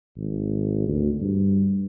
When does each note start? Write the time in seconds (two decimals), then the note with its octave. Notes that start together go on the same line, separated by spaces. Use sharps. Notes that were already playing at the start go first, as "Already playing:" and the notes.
0.17 G#1
0.88 D2
1.21 G2